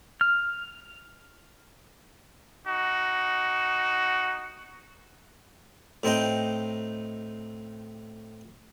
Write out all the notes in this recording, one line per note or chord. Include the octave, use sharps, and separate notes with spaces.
F6
D#4 F#4
A2 C4 D#4 G5